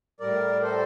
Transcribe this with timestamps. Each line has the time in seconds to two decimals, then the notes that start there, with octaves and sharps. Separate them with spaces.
0.20 A2 G3 A#4 D5
0.63 A4 C5